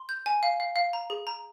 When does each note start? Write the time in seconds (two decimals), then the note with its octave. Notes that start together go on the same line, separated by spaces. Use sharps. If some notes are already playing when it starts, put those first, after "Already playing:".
Already playing: C6
0.09 G6
0.26 G#5
0.43 F5
0.60 F5
0.76 F5
0.93 A#5
1.10 G#4
1.27 A#5